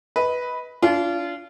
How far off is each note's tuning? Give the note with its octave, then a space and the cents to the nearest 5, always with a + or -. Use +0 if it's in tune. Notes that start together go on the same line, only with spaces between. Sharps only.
B4 +0 D#5 +25
D4 -35 F4 -25